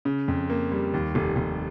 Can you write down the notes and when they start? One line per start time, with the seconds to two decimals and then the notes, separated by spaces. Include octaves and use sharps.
0.05 C#3
0.28 F2
0.50 A#3
0.72 G3
0.94 D#2
1.15 F1
1.36 F1